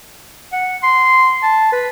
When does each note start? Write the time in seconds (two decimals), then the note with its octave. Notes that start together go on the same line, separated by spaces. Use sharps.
0.53 F#5
0.83 C6
1.43 A5
1.73 B4